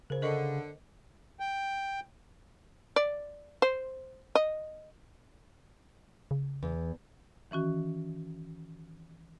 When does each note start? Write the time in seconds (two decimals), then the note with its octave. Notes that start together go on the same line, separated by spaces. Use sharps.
0.10 C#3 A#4 C5
0.22 D3 A#4 D#5 C#6
1.40 G5
2.96 D5
3.62 C5
4.35 D#5
6.31 C#3
6.63 E2
7.51 D#3 E3 C#4 F#4